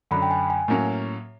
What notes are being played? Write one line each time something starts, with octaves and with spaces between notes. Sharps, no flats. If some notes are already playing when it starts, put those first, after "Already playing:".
F#2 D3 F#3 B5
G5
G#5
G#5
A2 F#3 A#3 C#4